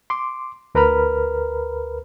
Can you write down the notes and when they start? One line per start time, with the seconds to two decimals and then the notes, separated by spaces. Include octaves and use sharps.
0.10 C6 D6
0.75 D2 A#4 B4 A#5 B5 F6